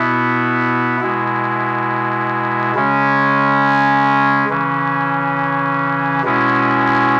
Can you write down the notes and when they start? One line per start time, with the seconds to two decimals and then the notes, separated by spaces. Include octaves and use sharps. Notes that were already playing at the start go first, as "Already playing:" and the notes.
Already playing: B2 B3 E4
1.00 B2 G#3 E4
2.75 C#3 G#3 C#4
4.49 C#3 E3 C#4
6.23 B2 G#3 C#4 E4